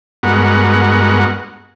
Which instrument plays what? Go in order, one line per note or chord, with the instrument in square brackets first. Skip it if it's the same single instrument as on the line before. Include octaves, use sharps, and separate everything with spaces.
[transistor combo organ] G2 G#3 B3 F#4 A#4 F#5